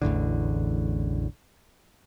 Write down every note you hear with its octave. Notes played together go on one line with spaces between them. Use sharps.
A1 E2 A2 D3